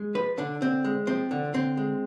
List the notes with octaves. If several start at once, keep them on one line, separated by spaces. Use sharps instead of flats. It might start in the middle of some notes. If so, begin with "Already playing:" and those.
Already playing: G#3
F3 B4
D3 D4
D3 C4
G#3
F3 C4
D3
D3 C4
G#3